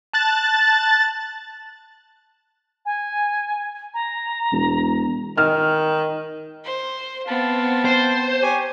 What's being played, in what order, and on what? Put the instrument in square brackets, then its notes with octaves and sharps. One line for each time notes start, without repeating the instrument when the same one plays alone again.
[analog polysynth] A5 F#6 A6
[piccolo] G#5
A#5
[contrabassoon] E1
[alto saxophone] D#3 [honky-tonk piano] F6
[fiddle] C5
[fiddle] B3 C4 [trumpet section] F5 A5
[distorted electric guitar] C5
[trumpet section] G4 C#5 G#5